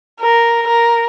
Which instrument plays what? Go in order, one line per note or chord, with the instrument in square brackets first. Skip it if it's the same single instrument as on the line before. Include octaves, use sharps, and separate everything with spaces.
[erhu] A#4
A#4